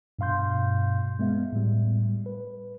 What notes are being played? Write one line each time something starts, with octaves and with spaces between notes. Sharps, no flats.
G2 B2 F5 C6 G6
G#3 B3 E5
A2 G3
B4